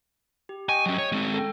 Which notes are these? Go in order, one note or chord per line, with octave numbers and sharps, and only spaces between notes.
G4
D#5 G5 G#5 C#6
F#3 C#4
C#5
G#3 C4
A4 G5